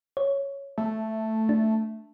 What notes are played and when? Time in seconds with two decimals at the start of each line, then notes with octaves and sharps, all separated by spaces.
0.17 C#5
0.78 A3
1.49 D4